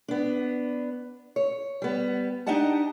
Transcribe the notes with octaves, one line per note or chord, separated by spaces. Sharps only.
B3 D4
C#5
G3 B3
D4 D#4 G4 D#5 F#5 A5